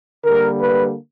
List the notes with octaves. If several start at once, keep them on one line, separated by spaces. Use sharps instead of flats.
D3 G3 A#3 A#4
B4